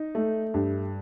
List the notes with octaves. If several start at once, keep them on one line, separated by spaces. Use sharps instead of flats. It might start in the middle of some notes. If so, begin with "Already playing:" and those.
Already playing: D#4
A3
G2